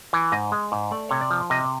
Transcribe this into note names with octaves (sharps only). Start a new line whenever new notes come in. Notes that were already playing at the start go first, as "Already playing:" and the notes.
E3
G#2 D#5
G#3
G#2
A3 D5
C3 C#5
D5
F3
C3 D#5